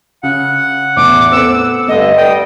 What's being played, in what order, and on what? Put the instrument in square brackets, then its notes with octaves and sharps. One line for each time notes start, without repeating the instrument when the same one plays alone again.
[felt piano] C#3 [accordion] F#5
[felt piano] E2 A2 [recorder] D6
[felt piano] B3 C4 A4 [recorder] E6
[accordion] G2 D3 [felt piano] A3 [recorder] D#5
[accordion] G3 G5 D#6